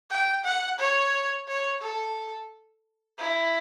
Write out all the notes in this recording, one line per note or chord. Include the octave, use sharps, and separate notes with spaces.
G5
F#5
C#5
C#5
A4
E4